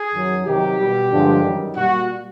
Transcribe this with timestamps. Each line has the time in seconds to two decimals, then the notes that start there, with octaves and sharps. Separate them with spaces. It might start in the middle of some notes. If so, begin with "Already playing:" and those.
Already playing: G#4
0.12 F#2 D#3 F#3
0.45 C3 D#3 F#3 G4
0.78 B2 G3
1.11 G2 D3 F3 G#3
1.43 F#2 D#3 G3
1.75 A#2 G3 F#4